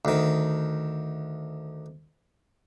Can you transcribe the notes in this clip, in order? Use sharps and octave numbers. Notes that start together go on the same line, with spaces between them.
D2 D#3